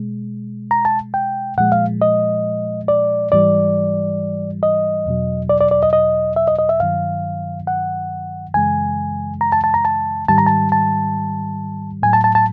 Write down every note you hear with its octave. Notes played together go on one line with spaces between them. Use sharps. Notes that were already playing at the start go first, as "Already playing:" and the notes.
Already playing: B2 G#3
A#5
A5
G5
A#2 F3 G#3 F#5
F5
D#5
D5
G#2 E3 G3 D5
D#5
E2 B2 F#3
D5
D5
D5
D#5
D#5
E5
D#5
D#5
E5
G2 D#3 F#3 F5
F#5
F#2 C#3 E3 G#3 G#5
A#5
A5
A5
A#5
A5
G#2 D#3 G3 A5
A#5
A5
A5
A2 F#3 G#5
A5
A5
A5